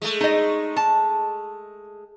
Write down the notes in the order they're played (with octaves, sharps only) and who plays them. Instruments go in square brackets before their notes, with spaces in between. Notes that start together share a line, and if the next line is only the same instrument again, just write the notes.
[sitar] G#3 A3
[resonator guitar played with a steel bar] D#4 D#5
A5